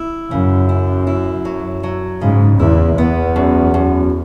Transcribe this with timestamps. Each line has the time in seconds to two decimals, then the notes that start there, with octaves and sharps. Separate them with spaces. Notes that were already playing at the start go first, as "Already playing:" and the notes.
Already playing: E4
0.31 F#2 C#3
0.69 E4
1.07 E4
1.45 F#3
1.83 F#3
2.21 G#2 C#3
2.59 E2 E4
2.98 E2 B3
3.36 F#2
3.74 F#2